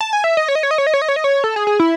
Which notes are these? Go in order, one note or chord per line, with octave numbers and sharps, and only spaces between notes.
A5
G#5
E5
D#5
C#5
D#5
C#5
D#5
C#5
D#5
C#5
D#5
C#5
D#5
C#5
A4
G#4
G#4
E4